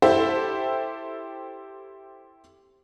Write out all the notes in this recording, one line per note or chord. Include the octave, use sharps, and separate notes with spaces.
E4 G4 A4 C5 E5